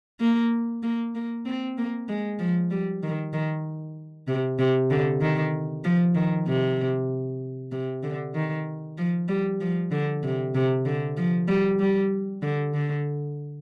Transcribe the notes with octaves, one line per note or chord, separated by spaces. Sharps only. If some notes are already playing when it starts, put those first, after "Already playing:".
A#3
A#3
A#3
C4
A#3
G#3
F3
G3
D#3
D#3
C3
C3
D3
D#3
F3
D#3
C3
C3
D3
D#3
F3
G3
F3
D3
C3
C3
D3
F3
G3
G3
D3
D3